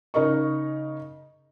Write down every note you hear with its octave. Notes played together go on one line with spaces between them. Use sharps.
C#3 D#4 A#4 D#5 C#6